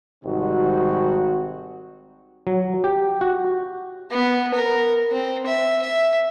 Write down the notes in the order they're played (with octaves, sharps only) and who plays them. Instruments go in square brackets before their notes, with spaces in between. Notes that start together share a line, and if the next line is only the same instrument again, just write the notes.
[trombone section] G#1 C3 G3 C4 D#4 F#4
[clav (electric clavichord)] F#3
G4
F#4
[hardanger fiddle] B3
A#4
C4
E5
E5